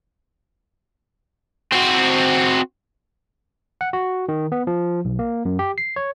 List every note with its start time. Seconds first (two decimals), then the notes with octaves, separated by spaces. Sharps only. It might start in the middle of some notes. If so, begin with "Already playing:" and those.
1.72 C4 F#4
3.81 F#5
3.93 F#4
4.29 D#3
4.52 B3
4.67 F3
5.05 B1
5.19 A#3
5.45 F#2
5.59 G4
5.78 C7
5.96 C#5